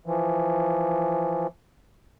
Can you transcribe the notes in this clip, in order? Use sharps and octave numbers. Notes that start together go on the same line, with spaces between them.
E3 F3